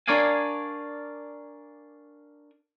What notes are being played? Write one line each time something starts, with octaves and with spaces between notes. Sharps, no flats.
D4 A#4 C#5 D5 F5 G#5